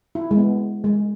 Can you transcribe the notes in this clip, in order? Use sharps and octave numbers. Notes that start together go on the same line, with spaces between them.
E4
G#3
B3
G#3